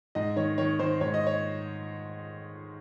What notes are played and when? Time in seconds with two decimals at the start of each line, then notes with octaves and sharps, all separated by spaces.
0.15 G#2 D#5
0.36 D#3 C#5
0.58 D#3 C#5
0.79 D#3 C5
1.01 G#2 C#5
1.14 D#5
1.27 C#5